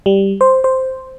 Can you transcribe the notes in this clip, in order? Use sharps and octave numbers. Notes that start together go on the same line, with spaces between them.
G3
C5
C5